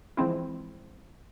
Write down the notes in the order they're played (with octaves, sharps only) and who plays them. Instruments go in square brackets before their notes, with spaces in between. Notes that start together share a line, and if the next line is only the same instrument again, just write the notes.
[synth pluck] E3 F3 G#3 C4 E4